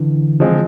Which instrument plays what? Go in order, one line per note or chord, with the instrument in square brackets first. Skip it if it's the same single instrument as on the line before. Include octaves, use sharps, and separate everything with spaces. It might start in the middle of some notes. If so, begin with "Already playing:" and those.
Already playing: [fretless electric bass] D3 E3
[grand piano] F3 G#3 C4